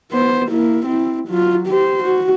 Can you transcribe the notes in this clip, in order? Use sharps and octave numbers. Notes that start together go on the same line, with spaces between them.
B3 C5
A#3 E4
C4 E4
F#3 F4
G4 C5
F#4